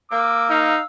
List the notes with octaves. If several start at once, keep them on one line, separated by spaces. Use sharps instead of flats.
A#3 D6 E6
D#4 F5